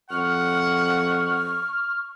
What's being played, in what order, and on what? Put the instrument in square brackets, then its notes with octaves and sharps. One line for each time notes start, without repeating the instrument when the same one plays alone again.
[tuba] F2 [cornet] F#5 [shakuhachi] C#6 [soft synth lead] F6